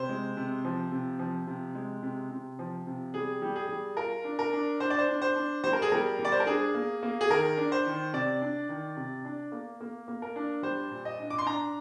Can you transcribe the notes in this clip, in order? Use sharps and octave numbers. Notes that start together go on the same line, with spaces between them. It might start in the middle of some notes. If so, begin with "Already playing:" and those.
Already playing: C3 C5
G#3
C3
F3
C3
F3
C3
G#3
C3
C3
F3
C3
G3 G#4
G3
G#4
G3
F4 A#4
D4
A#4
D4
D4 C5
D5
C5
D4
C5
D4
G3 C5
A#4
G#4
G3 A#4
G3
D5
C5
A#4
D4 G#4
A#3
A#3
G#4
D#3 A#4
D4
C5
D#3
C3 D5
D4
D#3
C3
D4
A#3
A#3
A#3
A#4
D4
G3 C5
A#2
D#5
D4
D6
C6
D4 A#5